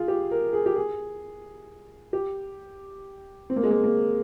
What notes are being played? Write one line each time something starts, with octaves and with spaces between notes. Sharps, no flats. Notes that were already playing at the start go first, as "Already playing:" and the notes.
Already playing: F4 G#4
G4
A#4
G#4
G4
G#4
G4
C4
A#3
G#3
A#3
A#3